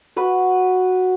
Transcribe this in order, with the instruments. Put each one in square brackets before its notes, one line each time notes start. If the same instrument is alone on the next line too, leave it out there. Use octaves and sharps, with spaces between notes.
[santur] F#4 B4 F#5